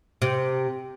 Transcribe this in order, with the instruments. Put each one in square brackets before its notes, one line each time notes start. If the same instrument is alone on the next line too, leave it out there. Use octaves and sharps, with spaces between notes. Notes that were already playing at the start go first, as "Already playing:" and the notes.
[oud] C3